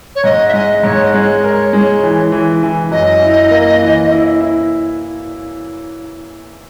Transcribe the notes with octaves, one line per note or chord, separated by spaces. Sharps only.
C#5
G#2 D#5
E5
G#3 D#5
G#2 C#5
D#5
G#3 C#5
A#4
G#3
E3
E3
E3
F#2 D#5
E4
A#3
E3
E4
E4